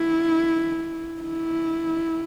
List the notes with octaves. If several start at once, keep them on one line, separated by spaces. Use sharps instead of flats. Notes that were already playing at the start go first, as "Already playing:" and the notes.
Already playing: E4
E4